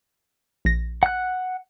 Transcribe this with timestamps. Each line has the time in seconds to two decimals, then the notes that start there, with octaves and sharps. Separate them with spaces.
0.65 A#1 A#6
1.03 F#5 F#6